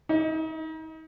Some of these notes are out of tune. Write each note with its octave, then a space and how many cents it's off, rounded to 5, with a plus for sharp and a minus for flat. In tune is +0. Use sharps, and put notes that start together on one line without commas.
D#4 +35